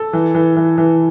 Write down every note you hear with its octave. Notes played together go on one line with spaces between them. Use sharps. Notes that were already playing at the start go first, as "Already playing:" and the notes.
Already playing: A4
E3
E3
E3
E3